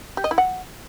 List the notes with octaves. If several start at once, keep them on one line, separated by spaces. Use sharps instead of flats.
G4
D#5
E4
F#5